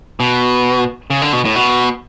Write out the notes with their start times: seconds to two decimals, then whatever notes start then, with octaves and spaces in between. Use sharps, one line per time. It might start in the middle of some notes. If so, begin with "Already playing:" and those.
0.20 B2
1.10 C#3
1.22 D3
1.33 B2
1.45 A2
1.56 B2